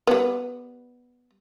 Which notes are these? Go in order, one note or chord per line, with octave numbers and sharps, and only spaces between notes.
G3 B3